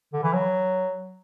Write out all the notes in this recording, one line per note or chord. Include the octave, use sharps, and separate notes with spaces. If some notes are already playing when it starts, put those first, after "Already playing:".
D3
E3
F#3